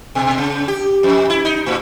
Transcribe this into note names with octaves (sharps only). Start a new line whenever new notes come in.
B2
C#3
G4
F2
E4
D#4
A2